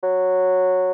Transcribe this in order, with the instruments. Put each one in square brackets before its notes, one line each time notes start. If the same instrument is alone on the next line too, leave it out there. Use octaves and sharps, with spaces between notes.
[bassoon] F#3